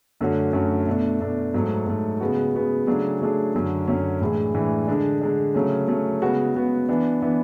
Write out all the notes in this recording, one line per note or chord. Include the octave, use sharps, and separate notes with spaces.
F#2 D3 A3 C#4 F#4
F#2 D3 A3 C#4 F#4
B2 A3 D4
B2 A3 D4
G#2 F#3 A3
G#2 F#3 A3
C#3 G#3 B3 F#4
C#3 G#3 B3 F#4
C#3 F#3 A3 D4 G#4
C#3 F#3 A3 D4 G#4
F#2 D3 F#3 C#4
F#2 D3 F#3 C#4
A2 E3 G#3 D4 G#4
A2 E3 G#3 D4 G#4
D3 G#3 D4
D3 G#3 D4
C#3 F#3 A3 C#4
C#3 F#3 A3 C#4
C#3 G#3 B3 F#4
C#3 G#3 B3 F#4
E3 B3 D4
E3 B3 D4